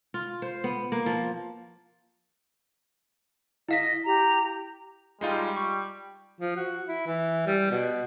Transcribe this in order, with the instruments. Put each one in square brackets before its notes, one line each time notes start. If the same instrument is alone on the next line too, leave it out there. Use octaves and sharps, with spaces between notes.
[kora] F4
C5
B3
A#3
F3
[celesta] E4 F5 B6 [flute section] D#5
[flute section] G4 A#5
[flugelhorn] G3 [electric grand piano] G#3 D#4 F4
[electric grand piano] C#6
[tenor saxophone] F3
F#4
E4
E3
G3
B2